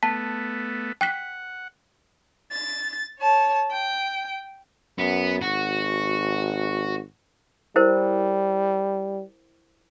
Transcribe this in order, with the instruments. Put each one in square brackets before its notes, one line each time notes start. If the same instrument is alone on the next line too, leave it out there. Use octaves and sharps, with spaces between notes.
[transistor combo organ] A3 B3 [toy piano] A5 [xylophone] B6
[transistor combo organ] F#5 [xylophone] G5 F#6 B6
[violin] A6
C#5 A5
G5
[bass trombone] F#2 [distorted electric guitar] B3
[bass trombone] G#1 [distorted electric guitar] F#4
[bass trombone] G3 [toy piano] E4 A#4 C5